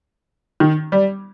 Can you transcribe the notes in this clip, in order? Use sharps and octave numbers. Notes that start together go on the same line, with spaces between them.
D#3
G3